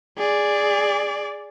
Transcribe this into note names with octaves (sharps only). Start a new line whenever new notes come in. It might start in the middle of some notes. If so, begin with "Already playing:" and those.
G#4 D5